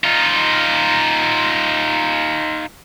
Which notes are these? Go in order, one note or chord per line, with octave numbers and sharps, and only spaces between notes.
D#4 F4